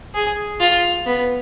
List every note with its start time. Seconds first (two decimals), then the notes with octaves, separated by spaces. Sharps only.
0.15 G#4
0.60 F4
1.06 B3